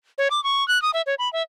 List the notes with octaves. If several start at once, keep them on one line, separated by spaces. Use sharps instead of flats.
C#5
D6
C#6
F#6
D#6
E5
C#5
B5
E5